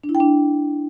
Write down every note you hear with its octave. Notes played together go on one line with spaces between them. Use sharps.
D4
E4
G5
D4